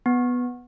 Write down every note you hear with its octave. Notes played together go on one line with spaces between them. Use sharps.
B3